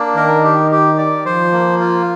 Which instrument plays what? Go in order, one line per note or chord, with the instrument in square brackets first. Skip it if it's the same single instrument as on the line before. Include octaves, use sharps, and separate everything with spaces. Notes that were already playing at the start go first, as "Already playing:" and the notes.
Already playing: [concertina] A#3 D4
[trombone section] D#3 [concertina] A#4
[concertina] G4
G4
D5
[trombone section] F3 [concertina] C5
[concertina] A#3
F4